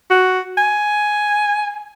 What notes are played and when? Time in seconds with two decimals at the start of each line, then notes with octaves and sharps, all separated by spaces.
0.11 F#4
0.58 G#5